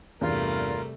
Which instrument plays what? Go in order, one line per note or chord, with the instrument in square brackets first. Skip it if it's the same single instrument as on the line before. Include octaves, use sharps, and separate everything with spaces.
[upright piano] E2 G2 [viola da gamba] C3 G3 A3 [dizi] F4 [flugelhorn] A#4